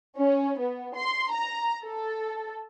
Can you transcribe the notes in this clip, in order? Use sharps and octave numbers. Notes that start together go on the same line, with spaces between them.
C#4
B3
C6
A#5
A4